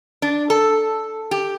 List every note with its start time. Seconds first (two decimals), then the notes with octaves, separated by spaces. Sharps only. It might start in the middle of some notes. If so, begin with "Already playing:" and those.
0.22 D4
0.50 A4
1.31 G4